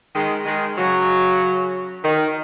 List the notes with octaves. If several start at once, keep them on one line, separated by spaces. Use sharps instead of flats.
D#3 G#3
D#3 G#3
C#3 F#3
D#3